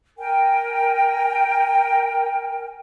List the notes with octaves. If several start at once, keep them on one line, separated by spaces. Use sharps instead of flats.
A#4 G5 G#5